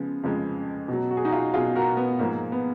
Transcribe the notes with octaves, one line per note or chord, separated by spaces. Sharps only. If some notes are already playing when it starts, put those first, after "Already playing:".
Already playing: C#3 F3 G#3 B3
F2 C#3 F3 G#3
B2 F#3
F#4
G#4
D#4 F#4
F4 G#4
B2 F#3 F4 G#4
F#4 A#4
B3
G#2 F3 G#3 A#3
B3